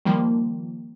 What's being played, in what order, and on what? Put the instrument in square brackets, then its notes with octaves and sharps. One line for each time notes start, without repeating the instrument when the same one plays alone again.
[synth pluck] D#3 F3 G3 A#3